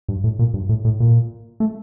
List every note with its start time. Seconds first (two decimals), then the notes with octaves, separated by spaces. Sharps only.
0.08 G2
0.24 A2
0.39 A#2
0.54 G2
0.69 A2
0.85 A2
1.00 A#2
1.60 A3